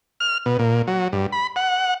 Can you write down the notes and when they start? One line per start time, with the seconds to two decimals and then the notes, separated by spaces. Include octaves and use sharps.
0.20 F6
0.46 B2
0.59 A#2
0.87 F#3
1.13 G2
1.32 B5
1.56 F#5